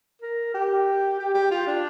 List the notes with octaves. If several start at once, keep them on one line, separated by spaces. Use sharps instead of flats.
A#4
G4
G4
G4
F4
D4